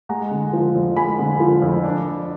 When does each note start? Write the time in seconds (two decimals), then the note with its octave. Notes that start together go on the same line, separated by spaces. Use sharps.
0.09 G#3 F#5 A#5
0.31 D3
0.53 F3
0.75 F2
0.96 G#3 G#5 B5
1.19 D3
1.40 F3
1.62 F2
1.84 D4